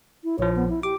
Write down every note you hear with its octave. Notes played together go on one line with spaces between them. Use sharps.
E4
A#1 F3 C#5
B3
E4
G4 D6